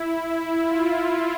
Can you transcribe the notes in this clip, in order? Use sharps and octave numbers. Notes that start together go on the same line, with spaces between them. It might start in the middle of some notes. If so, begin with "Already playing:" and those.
Already playing: E4
E4
F4
F4